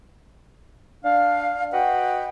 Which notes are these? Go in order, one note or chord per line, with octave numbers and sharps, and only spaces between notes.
D4 F5
F#4 B4 D#5 F#5 G5